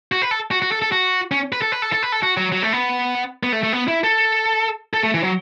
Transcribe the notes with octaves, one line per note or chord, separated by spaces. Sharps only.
F#4
B4
A4
F#4
F#4
A4
A4
F#4
C#4
B4
A4
B4
A4
A4
B4
A4
F#4
F#3
F#3
A3
B3
B3
A3
A3
B3
E4
A4
A4
A3
E3
F#3